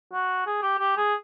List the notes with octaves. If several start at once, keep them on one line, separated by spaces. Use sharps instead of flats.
F#4
G#4
G4
G4
G#4